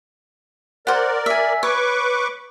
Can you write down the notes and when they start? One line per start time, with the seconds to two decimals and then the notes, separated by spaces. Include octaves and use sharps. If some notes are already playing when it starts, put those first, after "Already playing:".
0.87 A#4 C5 D5 F#5
1.26 E5 G#5
1.63 B4 C#5 C#6 D6